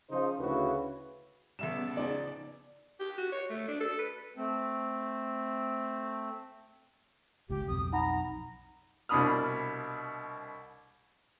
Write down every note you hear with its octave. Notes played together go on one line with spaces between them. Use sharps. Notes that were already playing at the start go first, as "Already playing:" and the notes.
C#3 F3 C#4 D#4 C5
D2 C#3 E4 F#4 B4
A1 C#3 G3 B3 E5 A5 E7
F3 D#4 G#4 D5
G4
F#4
C#5
A3
D4
A4
B4
A3 C4
G1 C#2 G4
B1 F2 D#6
D#4 F#5 A#5 B5
C2 B2 D4 B5 D#6 F6